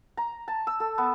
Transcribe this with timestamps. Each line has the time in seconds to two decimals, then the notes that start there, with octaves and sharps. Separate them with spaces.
0.17 A#5
0.48 A5
0.67 E6
0.80 A4
0.98 B3